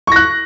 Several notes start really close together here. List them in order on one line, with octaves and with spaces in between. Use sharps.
C#6 A#6 F#6